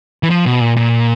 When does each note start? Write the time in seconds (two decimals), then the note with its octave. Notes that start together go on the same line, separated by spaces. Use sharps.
0.23 E3
0.30 F3
0.46 B2
0.60 A#2
0.77 A#2